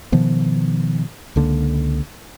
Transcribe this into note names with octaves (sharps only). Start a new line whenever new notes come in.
B2 D#3 F3 B3
C#2 D3 A#3